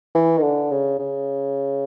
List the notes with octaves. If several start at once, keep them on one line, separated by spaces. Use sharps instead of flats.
E3
D#3
D3
C#3
C#3